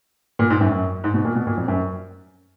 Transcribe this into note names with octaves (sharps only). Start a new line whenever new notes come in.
A#2
G#2
F#2
F#2
G#2
B2
A#2
B2
A#2
F2
F#2